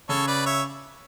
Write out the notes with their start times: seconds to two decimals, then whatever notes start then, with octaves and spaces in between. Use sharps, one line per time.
0.09 C#3 A4 C#5
0.27 B4 D5
0.46 C#5 E5